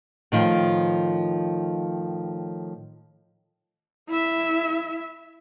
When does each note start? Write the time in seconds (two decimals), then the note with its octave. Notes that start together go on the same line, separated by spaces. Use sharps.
0.32 A2 D#3 F3
4.08 E4 E5